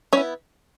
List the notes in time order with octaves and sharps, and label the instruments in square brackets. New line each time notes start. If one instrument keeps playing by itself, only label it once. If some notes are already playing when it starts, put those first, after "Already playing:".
[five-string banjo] B3 C#4 E4 C#5